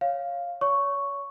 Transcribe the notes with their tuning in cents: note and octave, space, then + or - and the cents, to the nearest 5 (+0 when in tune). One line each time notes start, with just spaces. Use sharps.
C#5 -5 F5 +0
C#5 +30 C#6 +0